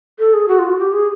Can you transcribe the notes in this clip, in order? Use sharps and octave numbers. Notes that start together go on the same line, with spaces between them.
A4
G#4
F#4
F4
F#4
G4
G#4